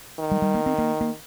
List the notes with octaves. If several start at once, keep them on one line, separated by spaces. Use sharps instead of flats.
D#3
G3
G3
A#3
C4
A#3
A#3